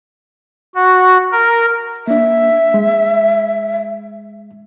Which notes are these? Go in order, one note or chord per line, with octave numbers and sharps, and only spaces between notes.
F#4
A#4
A#3 D4 E5
G#3